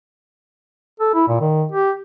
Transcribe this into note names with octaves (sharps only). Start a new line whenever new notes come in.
A4
E4
A#2
D#3
G4